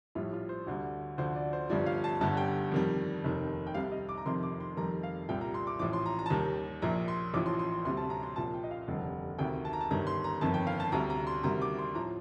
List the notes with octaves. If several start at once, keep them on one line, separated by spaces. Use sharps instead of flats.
A#1 A2 G3 F4
F4
C5
D2 D3 G3
D2 D3 F3 C5
D5
C5
G1 G2 F3 D5
F5
A5
G1 G2 D3 G3 A5
G5
F2 D#3 G3
F1 D#2 D#3
G5
C2 C3 G3 F5
D#5
D6
A#5
F1 F2 C3 D#3 C6
D6
C6
F1 F2 D#3 G3 A#5
F5
C2 A#2 G3 G5
A#5
C6
D6
A1 A2 F3 D6
C6
A#5
A#5
A5
D#2 D#3 G3 A#5
A#1 A#2 F3 A#5
C6
A1 A2 F3 D6
C6
C6
C6
D2 C3 G3 C6
A5
A#5
C6
C2 A#2 F3 A5
G5
D#5
F5
F1 D#2 D3 G3
D2 C3 D#3 G5
A5
A#5
A5
G1 G2 D#3 A#5
C6
A#5
G1 F2 D#3 A5
G5
F5
A5
D2 C3 G3 A#5
A#5
C6
D2 C3 D#3 G3 A#5
D6
C6
A2 F3 A#5